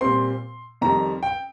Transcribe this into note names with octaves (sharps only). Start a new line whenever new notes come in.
A#2 G3 C4 C6
F2 D#3 G3 A#5
G5